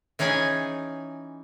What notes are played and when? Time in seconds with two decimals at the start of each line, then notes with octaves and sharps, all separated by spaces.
0.19 E3 C#4 D#4 G#4 G5 G#5